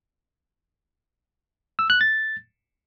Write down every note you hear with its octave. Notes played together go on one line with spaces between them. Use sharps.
E6
F#6
A6